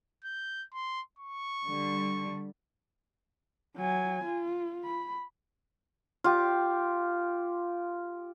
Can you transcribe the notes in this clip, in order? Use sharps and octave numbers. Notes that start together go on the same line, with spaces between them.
G6
C6
C#6
D3 G3
F#3 G#5
F4
B5
F4 G4